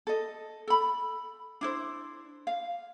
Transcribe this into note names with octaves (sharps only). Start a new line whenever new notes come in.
A4 D#5
A4 B5
D4 E4 C5
F5